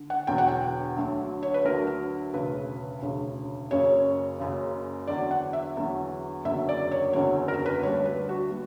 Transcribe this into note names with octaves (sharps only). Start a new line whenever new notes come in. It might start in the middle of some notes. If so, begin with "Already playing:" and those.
Already playing: D3
F#5
E1 E2 D3 F#3 G5
F#5
G5
D2 D3 F#3
C#5
B4
D2 D3 F#3 A#4
E1 D2 C#3 B4
E1 D2 C#3
F#1 F#2 C#3 C#5
F#1 F#2 C#3
E2 D3 F#3 D5
F#5
E5
E2 D3 F#3
F#1 E2 D3 F#3 E5
D5
C#5
F#1 E2 D3 F#3 C#5
A#4
B4
D2 D3 G3 C#5
B4
F#4
G3